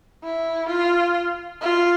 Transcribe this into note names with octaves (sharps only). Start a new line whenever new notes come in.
E4
F4
F4